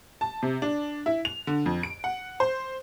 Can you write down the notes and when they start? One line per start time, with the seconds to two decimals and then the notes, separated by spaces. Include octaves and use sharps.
0.21 A5
0.43 C3
0.62 D4
1.06 E4
1.25 F7
1.47 D3
1.66 F2
1.83 D7
2.04 F#5
2.40 C5